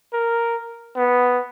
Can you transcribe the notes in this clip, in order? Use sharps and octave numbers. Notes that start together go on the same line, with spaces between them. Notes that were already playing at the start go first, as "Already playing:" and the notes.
A#4
B3